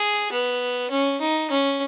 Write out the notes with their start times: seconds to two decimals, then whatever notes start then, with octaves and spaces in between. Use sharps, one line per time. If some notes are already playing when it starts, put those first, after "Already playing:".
Already playing: G#4
0.32 B3
0.91 C#4
1.21 D#4
1.50 C#4